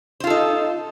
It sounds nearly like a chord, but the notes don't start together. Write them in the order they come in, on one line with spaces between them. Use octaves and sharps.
C5 F4 A4 D#4